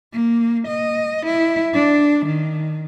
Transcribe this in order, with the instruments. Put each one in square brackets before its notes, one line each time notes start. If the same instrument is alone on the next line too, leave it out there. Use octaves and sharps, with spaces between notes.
[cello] A#3
D#5
E4
D4
D#3